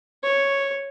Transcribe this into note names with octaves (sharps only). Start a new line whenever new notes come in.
C#5